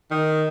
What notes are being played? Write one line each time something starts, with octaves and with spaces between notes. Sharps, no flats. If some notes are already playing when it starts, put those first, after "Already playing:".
D#3